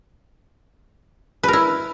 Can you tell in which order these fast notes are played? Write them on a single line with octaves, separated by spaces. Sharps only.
B4 A#4 E4